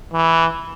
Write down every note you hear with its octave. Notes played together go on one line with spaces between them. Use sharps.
E3